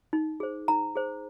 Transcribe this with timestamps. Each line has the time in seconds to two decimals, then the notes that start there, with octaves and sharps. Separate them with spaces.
0.13 D#4
0.40 G#4 C5
0.68 D#4 A#5
0.95 G#4 C5